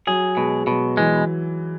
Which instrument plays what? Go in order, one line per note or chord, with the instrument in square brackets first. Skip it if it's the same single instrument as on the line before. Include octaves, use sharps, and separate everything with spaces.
[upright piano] F#3 [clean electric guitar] G#4
[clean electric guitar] B2 [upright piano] G#3
[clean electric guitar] B2 [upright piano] F#3
[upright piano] E3 [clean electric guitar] G#3